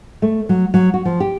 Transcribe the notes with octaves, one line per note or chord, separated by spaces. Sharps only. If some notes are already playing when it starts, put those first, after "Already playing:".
A3
F#3
F#3
F#4
F3
G4